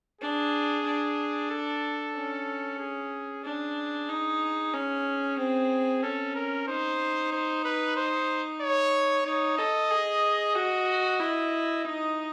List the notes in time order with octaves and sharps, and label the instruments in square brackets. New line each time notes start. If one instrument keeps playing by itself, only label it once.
[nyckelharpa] D4 [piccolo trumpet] G#4
[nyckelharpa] D4
[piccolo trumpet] A4
[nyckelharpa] C#4
[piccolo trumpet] G#4
[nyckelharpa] D4 [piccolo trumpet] G#4
[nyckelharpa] D#4
[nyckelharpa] C#4 [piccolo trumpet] G#4
[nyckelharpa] C4
[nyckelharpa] C#4 [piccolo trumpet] A4
[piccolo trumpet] A#4
[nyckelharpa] D#4 [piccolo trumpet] C5
[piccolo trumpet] C5
B4
C5
C#5
[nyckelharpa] D#4 [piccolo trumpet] C#5
[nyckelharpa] A4 [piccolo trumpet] D#5
[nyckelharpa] G#4
[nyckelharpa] F#4 [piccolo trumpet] D#5
[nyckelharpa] E4
[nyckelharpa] D#4 [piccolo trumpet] D#5